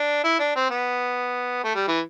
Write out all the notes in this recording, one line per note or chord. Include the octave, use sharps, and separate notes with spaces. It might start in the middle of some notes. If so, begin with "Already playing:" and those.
Already playing: D4
E4
D4
C4
B3
A3
G3
E3